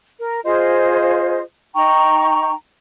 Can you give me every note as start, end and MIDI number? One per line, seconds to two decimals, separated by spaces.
0.19 0.40 70
0.44 1.41 65
0.44 1.41 68
0.44 1.41 72
0.44 1.41 75
1.75 2.53 63
1.75 2.53 79
1.75 2.53 82
1.75 2.53 85